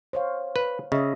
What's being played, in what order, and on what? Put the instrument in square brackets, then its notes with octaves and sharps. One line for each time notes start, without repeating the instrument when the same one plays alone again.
[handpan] C5 C#5 F5
[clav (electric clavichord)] B4
[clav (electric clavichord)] C#3 [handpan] D#5 E5